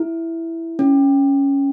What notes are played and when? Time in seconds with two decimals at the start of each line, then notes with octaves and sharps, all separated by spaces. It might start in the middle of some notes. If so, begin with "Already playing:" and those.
Already playing: E4
0.79 C#4